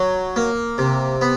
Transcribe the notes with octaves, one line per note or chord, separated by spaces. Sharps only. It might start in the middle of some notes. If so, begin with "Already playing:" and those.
Already playing: F#3
A#3
C3
B3